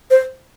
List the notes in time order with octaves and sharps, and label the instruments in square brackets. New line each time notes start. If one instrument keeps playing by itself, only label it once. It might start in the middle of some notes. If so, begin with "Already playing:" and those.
[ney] C5